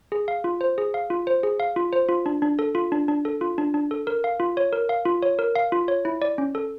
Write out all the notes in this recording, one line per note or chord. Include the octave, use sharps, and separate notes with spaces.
G#4
F5
F4
C5
G#4
F5
F4
C5
G#4
F5
F4
C5
F4
D4
D4
A4
F4
D4
D4
A4
F4
D4
D4
A4
A#4
F5
F4
C#5
A#4
F5
F4
C#5
A#4
F5
F4
C#5
E4
D5
C#4
A4